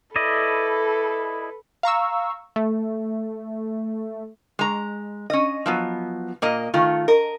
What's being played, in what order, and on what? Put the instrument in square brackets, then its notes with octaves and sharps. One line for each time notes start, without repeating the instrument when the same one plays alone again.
[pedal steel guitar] E4 D5 D#5 [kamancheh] A4 B4
[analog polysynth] F5 A#5 C#6 E6
A3
[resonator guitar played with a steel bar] G#3 A#5
C#4 D#5
F3 F#3 B3
A#2 A#3 D#5
D#3 A3 F4
A#4 D#5